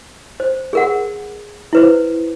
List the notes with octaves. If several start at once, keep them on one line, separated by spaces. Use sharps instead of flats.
C5
G#4 A#4 F#5
E4 B4 C5